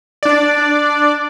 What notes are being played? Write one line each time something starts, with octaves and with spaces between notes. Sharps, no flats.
D4 D5